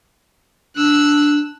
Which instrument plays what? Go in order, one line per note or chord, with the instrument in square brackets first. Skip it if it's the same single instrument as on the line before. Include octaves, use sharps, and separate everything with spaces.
[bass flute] D4 [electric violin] E6 F#6